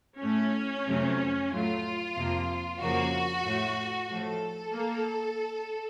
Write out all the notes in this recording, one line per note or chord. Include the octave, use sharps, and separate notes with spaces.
A2 A3 C#4
F2 C3 F#3 A3
A2 F#3 A3 F4
F2 C3 F3 A#3
F2 C#3 F3 A#3 F#4
A2 A3
A2 F3 A3 A4
A#3